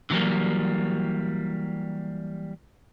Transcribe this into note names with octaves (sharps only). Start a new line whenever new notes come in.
D3 E3 F#3 G3 A#3